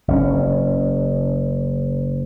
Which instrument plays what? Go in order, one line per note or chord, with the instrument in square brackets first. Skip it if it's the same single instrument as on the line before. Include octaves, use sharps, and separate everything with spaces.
[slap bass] F#1 C#4